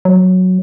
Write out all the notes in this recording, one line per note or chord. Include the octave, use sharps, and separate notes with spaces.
F#3